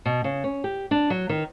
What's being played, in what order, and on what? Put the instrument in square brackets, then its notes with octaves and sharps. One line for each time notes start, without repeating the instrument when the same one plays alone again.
[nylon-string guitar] B2
C#3
C#4
G4
D4
F#3
D#3